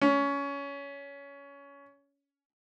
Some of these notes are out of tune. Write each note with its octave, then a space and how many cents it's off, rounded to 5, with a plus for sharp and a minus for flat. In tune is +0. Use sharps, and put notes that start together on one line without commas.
C#4 +20